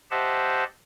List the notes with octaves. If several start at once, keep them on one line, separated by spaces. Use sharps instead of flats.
G4 C5 D#5 E5 F#5 A5